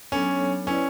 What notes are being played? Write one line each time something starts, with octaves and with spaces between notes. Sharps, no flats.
F#3 B3 C#4 D4 A4 C#5
C#4 E4 B4 D5